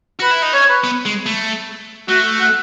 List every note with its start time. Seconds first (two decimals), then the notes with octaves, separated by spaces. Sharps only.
0.19 F#4 B4
0.31 E4
0.42 D#4
0.53 C#4 C#5
0.69 B4
0.84 B3
1.05 G#3
1.26 A3
2.09 A3 F#4
2.41 F#5